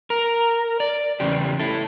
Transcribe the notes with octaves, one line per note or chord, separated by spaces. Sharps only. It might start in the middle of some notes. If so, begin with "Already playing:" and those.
A#4
D5
E2 C#3 G4
E4 A4